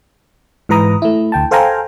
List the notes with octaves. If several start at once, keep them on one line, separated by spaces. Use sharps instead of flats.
G#2 E3 B4 A#5 D#6
A3 E4
D2 G5 A5
A4 C5 F5 G5 G#5 A#5